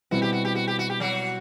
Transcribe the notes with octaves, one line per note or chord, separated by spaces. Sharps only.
B2 G3 C4 E4 F#4
G4
F#4
G4
F#4
G4
F#4
G4
F#3 F#4